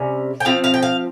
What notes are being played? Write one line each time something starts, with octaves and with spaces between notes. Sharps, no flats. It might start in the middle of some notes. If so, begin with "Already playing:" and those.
Already playing: C3 G3 C#4
G5
F3 C4 F5
F5
G5
F5